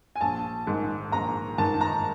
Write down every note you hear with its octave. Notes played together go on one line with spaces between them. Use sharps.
G#5
A#1 A5
G#2 D#3
A#1 A#5
G#2 D#3 A5
A#5